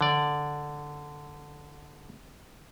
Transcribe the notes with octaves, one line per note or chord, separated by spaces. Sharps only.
D3 D5